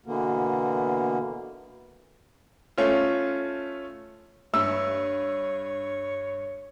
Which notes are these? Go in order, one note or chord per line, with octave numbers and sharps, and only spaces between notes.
B2 D3 E3 A#3 B3
A3 C#4 F4
G2 C#5 E5 E6